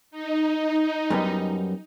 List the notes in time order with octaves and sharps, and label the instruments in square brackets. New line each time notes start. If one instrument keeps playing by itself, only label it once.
[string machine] D#4
[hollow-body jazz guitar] F#2 G3 B3